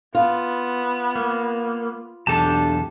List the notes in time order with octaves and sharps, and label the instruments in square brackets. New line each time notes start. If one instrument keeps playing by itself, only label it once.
[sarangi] B3 [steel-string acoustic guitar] F4
[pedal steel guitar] A#3
[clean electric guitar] B1 E2 A4 [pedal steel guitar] D4 G4 A5